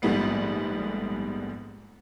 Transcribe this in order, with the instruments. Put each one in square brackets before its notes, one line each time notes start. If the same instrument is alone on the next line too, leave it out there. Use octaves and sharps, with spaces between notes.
[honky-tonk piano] A#1 G#2 G3 A3 B3 C7